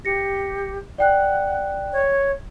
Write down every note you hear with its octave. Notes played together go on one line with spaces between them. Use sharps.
G4 A#6 C#7
D5 F#5 G5 F#6
C#5